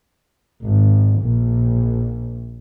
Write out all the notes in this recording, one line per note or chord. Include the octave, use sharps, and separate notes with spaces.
G#1
A#1